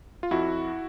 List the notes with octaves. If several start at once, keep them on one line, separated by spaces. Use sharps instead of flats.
F4
F2 E4 F#4